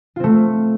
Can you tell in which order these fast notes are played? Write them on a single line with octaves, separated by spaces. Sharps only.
F4 C4 A3